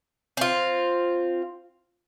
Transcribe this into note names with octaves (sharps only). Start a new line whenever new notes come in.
C4 F4